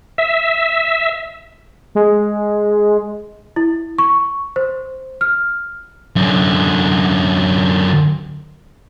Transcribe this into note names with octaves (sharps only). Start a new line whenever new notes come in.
E5
G#3
E4
C#6
C5
F6
F#2 D3